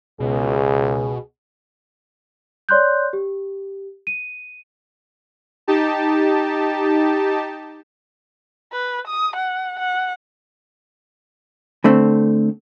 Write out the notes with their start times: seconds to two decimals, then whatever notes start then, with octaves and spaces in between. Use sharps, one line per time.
0.20 C#2 B2 G#4
2.69 C#5 D5 C6 F#6 G6
3.13 G4
4.07 D#7
5.67 D#4 G4 A5
8.73 B4
9.08 D#6
9.36 F#5
9.79 F#5
11.84 D3 A3 C4